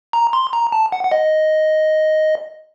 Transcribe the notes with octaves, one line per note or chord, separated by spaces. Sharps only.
A#5
C6
A#5
A5
F#5
F#5
D#5